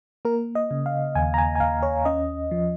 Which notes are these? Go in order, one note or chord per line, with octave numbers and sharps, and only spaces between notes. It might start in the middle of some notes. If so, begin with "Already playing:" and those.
A#3 A#4
D#5
C#3
F5
D#2 G#5
A#5
G#5
G#5
D#2 F5
C#5
C#4 D#5
F3